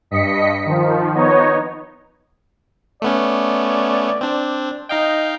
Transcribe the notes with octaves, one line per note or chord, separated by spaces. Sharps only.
G2 D#5 B6 C#7
D#3 F3
B3 D#4 C#5 D#5
A3 B3 C#4 D5
C4 D4
D#4 D#5 F5 G5